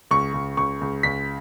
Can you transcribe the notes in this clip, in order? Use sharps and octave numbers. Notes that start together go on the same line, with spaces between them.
C#2 C#6
C#2
C#2 C#6
C#2
C#2 B6